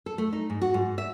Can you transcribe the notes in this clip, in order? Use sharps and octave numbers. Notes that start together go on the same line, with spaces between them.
A4
A3
D#4
G#2
F#4
G#2
E5